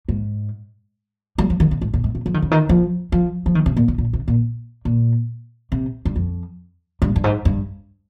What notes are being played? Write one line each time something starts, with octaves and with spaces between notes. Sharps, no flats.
G#2
G3
F3
D#3
C3
G#2
A#2
G#2
C3
F3
D#3
C#3
D#3
F3
F3
F3
D#3
C3
A#2
A#2
A#2
C3
A#2
A#2
C3
G2
F2
G2
G2
G#2
G2